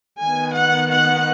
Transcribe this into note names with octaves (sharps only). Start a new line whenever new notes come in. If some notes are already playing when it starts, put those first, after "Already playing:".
D#3 B3 G#5
F#5
F#5